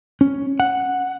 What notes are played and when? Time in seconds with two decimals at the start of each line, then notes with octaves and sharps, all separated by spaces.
0.21 C#4
0.60 F#5